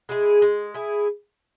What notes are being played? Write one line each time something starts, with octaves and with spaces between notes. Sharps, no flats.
G#3 E4 G#4
G#3
E4 G#4